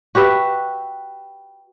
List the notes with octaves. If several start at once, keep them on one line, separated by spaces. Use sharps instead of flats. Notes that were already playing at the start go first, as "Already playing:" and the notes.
F#4 G4 B4 E5